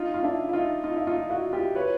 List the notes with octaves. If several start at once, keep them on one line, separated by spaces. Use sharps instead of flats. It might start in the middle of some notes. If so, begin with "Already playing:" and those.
Already playing: D#4 F4
F4
D4 E4
E4
D#4 F4
D#4 F4
E4
D#4 F4
E4 F#4
F4 G4
B4 C#5